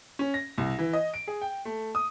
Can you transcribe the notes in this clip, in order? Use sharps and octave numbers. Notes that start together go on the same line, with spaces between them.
C#4
A#6
C2
E3
D#5
D7
G#4
G5
A3
D#6